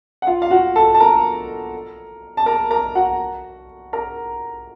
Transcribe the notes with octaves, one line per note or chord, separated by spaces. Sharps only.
F#5
F4 F5
F5
F#4 F#5
A4 A5
A5
A#4 A#5
A5
A#4 A#5
A#4 A#5
F#4 F#5
A#4 A#5